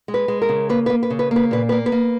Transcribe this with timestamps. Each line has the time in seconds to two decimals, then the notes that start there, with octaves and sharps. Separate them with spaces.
0.08 G#3
0.14 B4
0.28 G#3
0.42 A#4
0.49 C#3
0.69 A#3 B4
0.86 B4
0.90 A#3
1.03 B4
1.10 C#3
1.19 B4
1.31 A#3 B4
1.51 A#2 B4
1.69 A#3 B4
1.86 B4
1.92 A#3